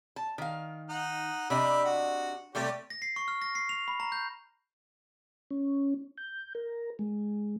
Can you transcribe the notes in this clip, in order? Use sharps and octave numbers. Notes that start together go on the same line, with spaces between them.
A5
D#3 F5
D#4 F#5
C3 D4 G4 D#5 E5 B5
F#4
C3 G3 A3 G4 C#5
A#6
C7
C#6
F6
A#6
C7
F7
B5
A#5
G6
C#4
G6
A#4
G#3